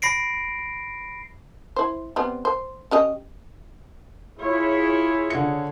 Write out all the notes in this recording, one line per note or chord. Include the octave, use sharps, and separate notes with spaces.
B5 A#6 C7 D7
E4 C5
G3 B3 C4
C5
C#4 G4 D#5
E4 F4 G#4 C#5
D3 C#7